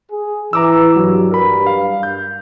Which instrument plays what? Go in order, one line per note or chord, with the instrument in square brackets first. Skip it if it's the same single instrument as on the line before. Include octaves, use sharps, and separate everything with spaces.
[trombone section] G#4
[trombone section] E3 [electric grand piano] A#5 D6 E6
[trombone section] G2 [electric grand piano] F#3
[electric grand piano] A#4 B5
F5
G6